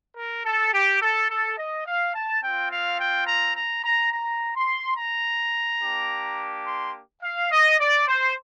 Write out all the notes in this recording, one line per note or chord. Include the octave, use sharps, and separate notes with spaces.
A#4
A4
G4
A4
A4
D#5
F5
A5
C4 F4 G5
F5
G5
A#5
A#5
A#5
A#5
C6
A#5
A#3 D4 G4
C6
F5
D#5
D5
C5